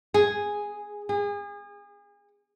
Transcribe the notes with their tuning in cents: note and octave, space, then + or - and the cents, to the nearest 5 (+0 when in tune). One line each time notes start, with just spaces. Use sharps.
G#4 -5
G#4 -35